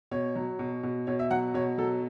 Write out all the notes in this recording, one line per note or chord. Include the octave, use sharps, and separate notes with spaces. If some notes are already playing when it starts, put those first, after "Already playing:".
B2 C#5
F#3
B2
B2
B2 C#5
E5
F#3 F#5
B2 C#5
F#3 A4